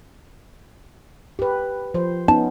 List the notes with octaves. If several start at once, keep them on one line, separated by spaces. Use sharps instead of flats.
G4 B4
F3 C5
B3 C#4 D#4 A5